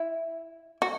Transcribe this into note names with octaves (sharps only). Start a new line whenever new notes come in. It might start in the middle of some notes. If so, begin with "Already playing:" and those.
Already playing: E4
F#4